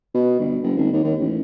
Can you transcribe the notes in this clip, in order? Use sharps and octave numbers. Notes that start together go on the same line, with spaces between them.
B2
G1
F#1
G#1
D#2
D#2
A1